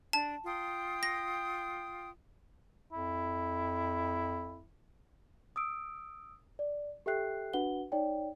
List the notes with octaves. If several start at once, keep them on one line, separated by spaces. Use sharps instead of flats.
D4 A5
F4 G5 D#6
A#6
F2 E4
D#6 E6 D7
D5
G4 A4 E5 G5 F#6 C7
D4 F#4 B4 F#5 G7
D#4 C#5 D5 G5